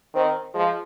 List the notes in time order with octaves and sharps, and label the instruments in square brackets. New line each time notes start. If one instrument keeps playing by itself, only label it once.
[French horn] D#3 [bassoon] C4
[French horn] F3 [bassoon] G#3